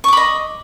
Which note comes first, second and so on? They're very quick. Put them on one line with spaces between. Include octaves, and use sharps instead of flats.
C#6 D6 B5 D#5